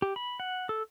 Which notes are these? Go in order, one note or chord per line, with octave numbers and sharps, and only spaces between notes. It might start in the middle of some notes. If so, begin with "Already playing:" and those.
G4
B5
F#5
A4